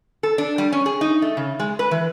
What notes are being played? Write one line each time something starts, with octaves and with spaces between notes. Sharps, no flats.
A4
D4
G3
C#4
G#4
D#4
A3
C#3
G#3
B4
E3